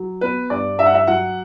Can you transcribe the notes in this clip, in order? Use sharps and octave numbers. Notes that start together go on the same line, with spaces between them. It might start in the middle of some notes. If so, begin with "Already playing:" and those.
Already playing: F#3
B3 B4
G2 D5
G2 E5
F#5
E5
F#3 F#5